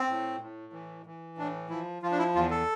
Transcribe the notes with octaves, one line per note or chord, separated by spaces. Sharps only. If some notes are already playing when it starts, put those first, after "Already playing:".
Already playing: C4
A2
A2
E3
E3
A2 D4
F3 E4
F3 F4
D4
E4
E2 F4
A4